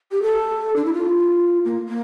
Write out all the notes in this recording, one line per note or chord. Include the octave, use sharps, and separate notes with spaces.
G4
A4
D4
E4
F4
A#3
A#3